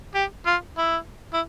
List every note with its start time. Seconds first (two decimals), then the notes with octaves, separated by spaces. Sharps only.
0.15 G4
0.46 F4
0.78 E4
1.34 E4